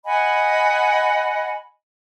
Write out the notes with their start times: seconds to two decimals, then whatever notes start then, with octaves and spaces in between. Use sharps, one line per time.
0.05 D#5 F#5 G#5 B5